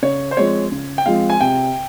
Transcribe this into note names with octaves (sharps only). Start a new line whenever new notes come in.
C#3 C#5
C5
F3 G#3 C4 C#5
C#3
G5
F3 G#3 C4 F5
G#5
C3 G5